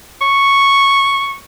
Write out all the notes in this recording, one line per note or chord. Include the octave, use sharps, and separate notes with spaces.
C#6